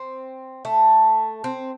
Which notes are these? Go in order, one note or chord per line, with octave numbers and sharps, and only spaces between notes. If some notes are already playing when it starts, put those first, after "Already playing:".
Already playing: C4
A3
C4